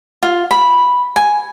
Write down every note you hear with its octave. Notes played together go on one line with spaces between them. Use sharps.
F4
B5
G#5